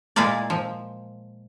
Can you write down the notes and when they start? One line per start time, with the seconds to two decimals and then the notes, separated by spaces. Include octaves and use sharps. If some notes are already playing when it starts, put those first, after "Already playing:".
0.16 A#2 G#3 E4 F4 A#4 D5
0.50 F3